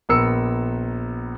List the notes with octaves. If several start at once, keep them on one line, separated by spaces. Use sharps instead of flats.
A#1 B3 A#4 A#5 E6 C#7